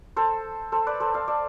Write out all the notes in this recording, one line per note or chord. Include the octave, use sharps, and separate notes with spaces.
A4 C5
A4 C5
B4 D5
A4 C5
D5 F5
D5 F5